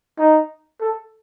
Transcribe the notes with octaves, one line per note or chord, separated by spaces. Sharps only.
D#4
A4